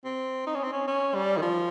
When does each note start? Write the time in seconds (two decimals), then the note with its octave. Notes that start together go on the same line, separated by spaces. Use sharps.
0.05 C4
0.46 D#4
0.55 C#4
0.63 C4
0.72 C#4
0.87 C#4
1.15 G3
1.37 D#3
1.42 F3